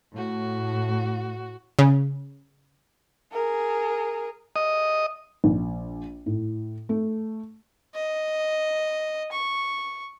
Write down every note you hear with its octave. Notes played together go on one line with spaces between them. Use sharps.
A2 F#4
C#3
G#4 A#4
D#5
A#1
A2
A3
D#5
C#6